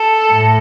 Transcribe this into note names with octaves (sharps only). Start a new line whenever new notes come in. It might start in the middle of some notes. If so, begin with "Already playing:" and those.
Already playing: A4
A2